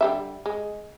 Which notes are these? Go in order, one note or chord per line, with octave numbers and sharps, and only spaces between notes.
D3 G3 E5
G#3